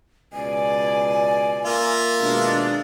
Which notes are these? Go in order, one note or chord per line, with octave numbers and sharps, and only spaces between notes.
C#2 B2 D5 G#5
A#3 F4 E5
B2 D#3 G#3 D4